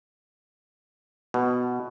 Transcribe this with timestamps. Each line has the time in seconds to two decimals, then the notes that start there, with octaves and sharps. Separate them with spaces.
1.34 B2